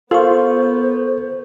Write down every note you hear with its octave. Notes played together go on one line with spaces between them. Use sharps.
B3 F4 A4 A#4 C5 C#6